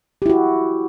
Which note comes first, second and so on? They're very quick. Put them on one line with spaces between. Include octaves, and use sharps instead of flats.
G4 E4 F#4